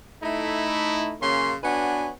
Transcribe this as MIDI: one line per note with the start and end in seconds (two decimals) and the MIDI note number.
0.23 1.15 57
0.23 1.15 63
0.23 1.15 64
1.21 1.54 49
1.21 1.54 54
1.21 1.54 58
1.21 1.54 61
1.21 1.54 84
1.64 2.10 59
1.64 2.10 62
1.64 2.10 66
1.64 2.10 71
1.64 2.10 73
1.64 2.10 80